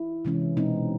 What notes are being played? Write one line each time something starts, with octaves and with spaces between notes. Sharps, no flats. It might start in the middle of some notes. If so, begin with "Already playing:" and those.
Already playing: E4
C3 E3 G#3 C#4
B2 G#3 C4 D#4